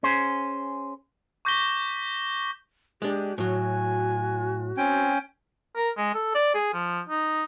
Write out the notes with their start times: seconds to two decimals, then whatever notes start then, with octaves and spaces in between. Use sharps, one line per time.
0.03 C#4 G#4 C5
1.45 C#6 D6 G6 A#6 B6 G7
3.02 G#3 D4 G4
3.38 A2 F#3 F#4 G#5
4.77 C4 C#4 G5
5.76 A#4
5.97 G#3
6.15 A4
6.35 D5
6.54 G#4
6.74 F3
7.09 D#4